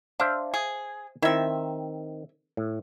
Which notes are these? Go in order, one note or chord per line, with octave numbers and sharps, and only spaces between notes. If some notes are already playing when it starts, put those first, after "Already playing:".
D4 C5 E5 F5
G#4
D#3 C4 E4 E5
A2